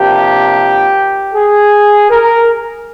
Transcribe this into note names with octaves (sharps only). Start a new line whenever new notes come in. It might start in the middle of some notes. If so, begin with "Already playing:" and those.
Already playing: C3 F3 A#3 D4 G4
G#4
A#4